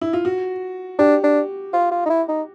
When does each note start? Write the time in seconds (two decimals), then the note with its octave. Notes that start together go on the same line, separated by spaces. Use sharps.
0.01 E4
0.13 F4
0.25 F#4
0.99 D4 G4
1.23 D4
1.73 F4
1.91 F4
2.06 D#4
2.10 E4
2.29 D#4